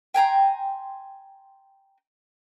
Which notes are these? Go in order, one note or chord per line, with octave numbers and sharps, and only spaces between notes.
G5 G#5 A#5 C6